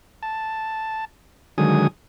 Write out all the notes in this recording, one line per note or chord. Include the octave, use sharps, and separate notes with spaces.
A5
D3 D#3 F#3 G#3 G#5 D#6